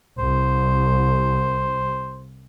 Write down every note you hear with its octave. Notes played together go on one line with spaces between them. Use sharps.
C2 C5